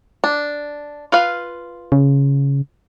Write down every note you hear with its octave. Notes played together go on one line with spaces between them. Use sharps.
D4
F4 B4 F5
C#3